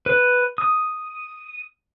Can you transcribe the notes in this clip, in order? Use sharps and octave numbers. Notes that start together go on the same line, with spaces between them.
B4
D#6